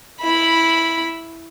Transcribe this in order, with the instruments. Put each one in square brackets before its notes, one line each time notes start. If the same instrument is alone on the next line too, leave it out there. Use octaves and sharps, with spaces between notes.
[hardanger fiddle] E4 B5